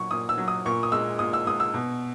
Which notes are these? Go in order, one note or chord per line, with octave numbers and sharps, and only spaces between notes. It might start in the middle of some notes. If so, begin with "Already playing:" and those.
Already playing: A#2 F#3 C#6
A#2 D#6
E6
F#3
D#6
A#2 C#6
D#6
G#3 E6
A#2 D#6
E6
G#3 D#6
E6
B2